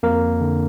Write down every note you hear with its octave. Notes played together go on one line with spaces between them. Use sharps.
F2 A#3 A#4
D3